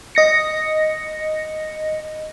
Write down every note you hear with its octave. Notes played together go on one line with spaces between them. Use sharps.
D#5 A#6 C#7